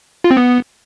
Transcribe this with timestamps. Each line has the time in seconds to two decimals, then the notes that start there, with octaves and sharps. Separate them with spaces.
0.24 F4
0.31 C4
0.37 B3